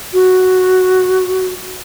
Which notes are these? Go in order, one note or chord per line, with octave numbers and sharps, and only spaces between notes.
F#4